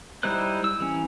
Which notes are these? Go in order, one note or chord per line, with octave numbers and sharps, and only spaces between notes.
G3 D#4 E4 C5 F#6
E6
E3 C#4